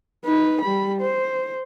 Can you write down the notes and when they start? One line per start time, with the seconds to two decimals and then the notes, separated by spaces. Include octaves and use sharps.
0.25 D#4 B4
0.61 G3 B5
1.01 C5